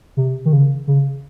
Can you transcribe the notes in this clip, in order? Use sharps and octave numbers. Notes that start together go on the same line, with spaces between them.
C3
D#3
C#3
C#3